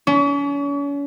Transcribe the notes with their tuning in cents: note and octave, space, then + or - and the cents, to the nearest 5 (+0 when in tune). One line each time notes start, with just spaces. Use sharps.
C#4 +40